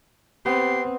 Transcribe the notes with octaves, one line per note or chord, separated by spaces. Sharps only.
B3 C4 G4 C7